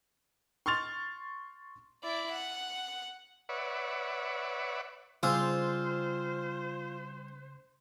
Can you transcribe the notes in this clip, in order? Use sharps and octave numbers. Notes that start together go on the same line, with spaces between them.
C6 C#6 F6 A6 F7
E4 D5
F#5
B4 C#5 D5 E5 F#5
C#3 G3 C4 F4 G#4 C5 E6